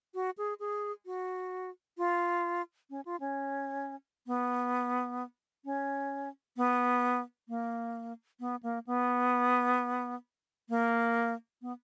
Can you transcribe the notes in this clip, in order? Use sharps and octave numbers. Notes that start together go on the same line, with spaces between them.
F#4
G#4
G#4
F#4
F4
C#4
F4
C#4
B3
C#4
B3
A#3
B3
A#3
B3
A#3
B3